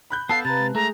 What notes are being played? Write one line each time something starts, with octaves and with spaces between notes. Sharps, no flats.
B5 F#6 G6
B3 A4 F5 A5 C7
C3 B4 A#5 B5 A6
G#3
A3 G#4 A#5